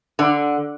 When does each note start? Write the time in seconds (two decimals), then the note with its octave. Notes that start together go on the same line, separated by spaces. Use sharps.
0.19 D3